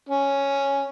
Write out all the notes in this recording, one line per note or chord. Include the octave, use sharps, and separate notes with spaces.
C#4